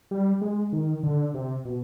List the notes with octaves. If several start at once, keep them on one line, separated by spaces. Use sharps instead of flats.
G3
G#3
D#3
D3
C3
B2